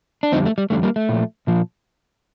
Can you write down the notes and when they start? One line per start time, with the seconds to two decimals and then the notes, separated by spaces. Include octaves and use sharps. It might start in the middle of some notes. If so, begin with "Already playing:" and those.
0.23 D4
0.32 F2 D3 G3 C4 D#4
0.45 A3
0.58 G3
0.70 F2 D3 G3 A3
0.83 G3 A#3
0.96 A3
1.09 A#2 F3
1.47 A#2 F3